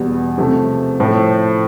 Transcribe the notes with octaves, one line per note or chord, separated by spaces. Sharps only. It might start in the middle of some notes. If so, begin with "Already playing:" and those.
Already playing: E2 B2 G3
C3 F3 A3
A2 F3 A3